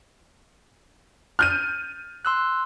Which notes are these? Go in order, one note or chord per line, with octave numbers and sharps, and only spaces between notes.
F6 G6 D#7
C6 E6 F#6